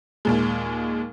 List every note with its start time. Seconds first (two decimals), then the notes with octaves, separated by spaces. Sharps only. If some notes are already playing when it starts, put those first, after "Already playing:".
0.25 D#2 A#2 G#3